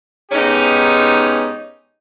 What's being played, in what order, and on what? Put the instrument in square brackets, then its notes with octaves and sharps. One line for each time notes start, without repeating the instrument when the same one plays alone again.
[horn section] G#2 B3 C#4 D#4 G4